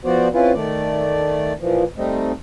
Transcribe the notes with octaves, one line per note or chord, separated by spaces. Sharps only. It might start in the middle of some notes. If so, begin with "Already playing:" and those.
F3 B3 F#4 C5 D5
C4 C#4 E4 F4 B4
D#3 A3 D5
A#2 E3 F3
G3 A3 C4 D#4